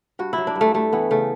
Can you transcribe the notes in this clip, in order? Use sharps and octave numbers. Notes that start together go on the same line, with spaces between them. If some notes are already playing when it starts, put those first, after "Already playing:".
G2 F#4
E4
F#3
D4
G2
A3
G3 A3
E3 B3
C#3 A3